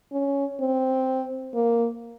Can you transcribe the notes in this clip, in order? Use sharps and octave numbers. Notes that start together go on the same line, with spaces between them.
C#4
C4
A#3